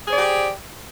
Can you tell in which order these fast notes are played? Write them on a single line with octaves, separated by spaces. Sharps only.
G#4 C5 D5 G4